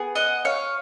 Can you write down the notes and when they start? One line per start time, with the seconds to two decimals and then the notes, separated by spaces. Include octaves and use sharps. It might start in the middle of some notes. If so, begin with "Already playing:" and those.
Already playing: B3 G#4
0.15 D#5 F#5
0.45 C#5 F5